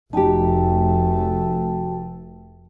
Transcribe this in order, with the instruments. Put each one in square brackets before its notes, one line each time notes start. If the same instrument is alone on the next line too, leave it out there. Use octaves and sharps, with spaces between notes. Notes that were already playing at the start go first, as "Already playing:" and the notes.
[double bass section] F1 A3 [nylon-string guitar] D#4 G4 [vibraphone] F#4 G5 A5